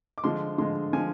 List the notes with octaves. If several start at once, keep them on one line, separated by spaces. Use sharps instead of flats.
D6
D3 F3 G#3 C6
D3 F3 G#3 C6
D3 F3 G#3 G#5